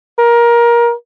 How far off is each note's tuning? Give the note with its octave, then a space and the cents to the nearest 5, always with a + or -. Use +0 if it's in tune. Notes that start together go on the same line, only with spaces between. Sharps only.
A#4 +20